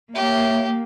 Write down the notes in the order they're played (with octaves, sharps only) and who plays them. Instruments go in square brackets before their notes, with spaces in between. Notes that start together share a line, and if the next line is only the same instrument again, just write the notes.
[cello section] A#3 [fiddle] G4 [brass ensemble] C#5 E5